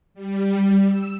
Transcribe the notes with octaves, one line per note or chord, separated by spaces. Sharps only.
G3
E6